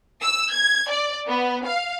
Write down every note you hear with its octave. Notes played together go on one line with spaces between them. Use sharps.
E6
G#6
D5
B3
F5